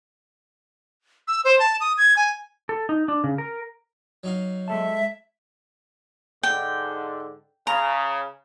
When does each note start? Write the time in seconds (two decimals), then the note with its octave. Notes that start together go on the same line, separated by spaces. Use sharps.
1.28 E6
1.45 C5
1.59 A5
1.81 D#6
1.98 G#6
2.17 G#5
2.69 A4
2.89 D#4
3.08 D4
3.24 C#3
3.38 A#4
4.23 F#3 D#4 F5
4.68 G#3 A4 E5 A5
6.43 G#2 D3 G5
7.67 C#3 A#5